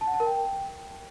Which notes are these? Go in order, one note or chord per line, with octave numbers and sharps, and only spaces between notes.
A5
F#5
A5
A#4
G5